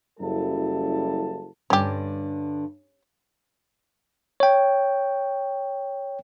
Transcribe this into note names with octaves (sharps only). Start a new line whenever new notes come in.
F#1 F#2 G3 E4 A4 A5
G2 D3 C#4 G4
C#5 G5